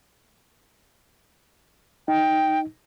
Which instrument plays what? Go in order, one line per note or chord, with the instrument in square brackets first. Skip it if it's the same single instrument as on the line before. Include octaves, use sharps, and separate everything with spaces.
[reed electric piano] D#4 [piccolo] G5